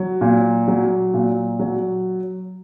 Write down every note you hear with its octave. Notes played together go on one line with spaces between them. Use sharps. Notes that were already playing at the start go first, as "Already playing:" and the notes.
Already playing: F#3
A#2
F#3
A#2
F#3